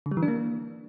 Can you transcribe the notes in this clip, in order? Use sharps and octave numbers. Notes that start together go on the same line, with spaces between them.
D3
G3
E3
D4
A#3